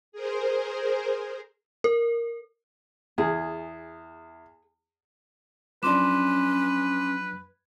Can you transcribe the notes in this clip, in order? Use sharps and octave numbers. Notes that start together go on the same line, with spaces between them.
G#4 A#4 C5
A#4
E2 G#4
F3 F#3 C#4 D4 B4 C6 D6 E7